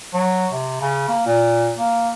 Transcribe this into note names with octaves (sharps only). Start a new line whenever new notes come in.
F#3
C3
C#3
A#3
A#2
A#3